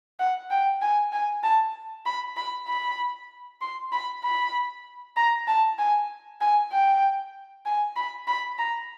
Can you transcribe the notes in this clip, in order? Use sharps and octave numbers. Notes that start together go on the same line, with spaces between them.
F#5
G5
G#5
G#5
A5
B5
B5
B5
C6
B5
B5
A#5
A5
G#5
G#5
G5
G#5
B5
B5
A#5